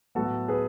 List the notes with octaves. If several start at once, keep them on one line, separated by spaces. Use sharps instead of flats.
A2 F#3 B3 F#4 A4
G#4 B4